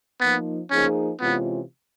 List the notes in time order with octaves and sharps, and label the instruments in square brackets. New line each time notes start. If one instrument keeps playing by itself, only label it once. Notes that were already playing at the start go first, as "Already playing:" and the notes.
[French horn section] F3 A#3 D#4 [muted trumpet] B3
[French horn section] F3 A#3 D#4 G#4 C5 [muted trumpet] C#4
[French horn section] C3 E3 G#3 C#4 F4 [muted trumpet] B3